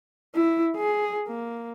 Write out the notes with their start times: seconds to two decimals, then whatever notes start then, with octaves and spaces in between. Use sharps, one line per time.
0.35 E4
0.76 G#4
1.27 A#3